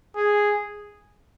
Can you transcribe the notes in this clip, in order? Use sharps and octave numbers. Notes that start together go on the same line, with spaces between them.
G#4